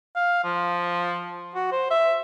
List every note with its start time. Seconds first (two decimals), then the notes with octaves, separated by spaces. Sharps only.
0.16 F5
0.44 F3
1.55 F#4
1.72 C5
1.91 E5